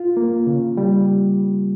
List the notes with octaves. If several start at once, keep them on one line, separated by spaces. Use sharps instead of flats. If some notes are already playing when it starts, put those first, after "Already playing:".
Already playing: F4
A#3
C#3
G3